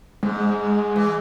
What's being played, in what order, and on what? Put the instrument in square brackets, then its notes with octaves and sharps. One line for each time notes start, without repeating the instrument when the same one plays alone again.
[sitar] G#2 [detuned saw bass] G#3
[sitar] E3